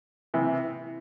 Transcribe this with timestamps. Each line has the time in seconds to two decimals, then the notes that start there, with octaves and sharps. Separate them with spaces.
0.34 C3 E3